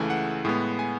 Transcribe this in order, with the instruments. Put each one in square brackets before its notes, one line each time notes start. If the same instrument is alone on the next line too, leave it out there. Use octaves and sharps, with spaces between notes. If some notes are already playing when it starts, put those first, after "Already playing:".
Already playing: [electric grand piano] C#2 C#3 E3 A3 G#5
F#5
A2 G#3 B3
G#5